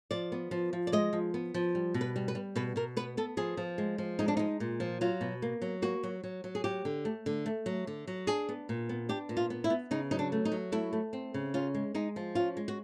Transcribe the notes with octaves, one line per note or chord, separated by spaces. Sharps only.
F3 D5
B3
F3
F3
D5
G#3 D#5
F3
B3
F3
G3
B2
B4
G3
B4
G3
B2 B4
B2 A#4
B3 B4
B3 A4
F3 G#4
F3
G#3
F3
G#3 D#4
D4
G#3 D#4
A#2
F3
F#3 F4
B2
A#3
F#3
A#3 F#4
F#3
F#3
F#3
G#4
F#3 G4
D3
A3
D3
A3
F#3
D3
F#3
D4 G#4
B3
A#2
B3
D4 G4
A#2
F4
B3
E4
B3
C#3 D#4
F#3 D#4
D4
A3
D#4
F#3
A3 E4
A3
C4
C#3
C#4 F4
G#3
G#3 D#4
F3
C#4 F4
G#3
F#4